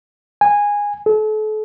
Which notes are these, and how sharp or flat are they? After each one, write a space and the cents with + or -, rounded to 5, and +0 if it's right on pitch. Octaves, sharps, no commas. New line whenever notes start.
G#5 -15
A4 -40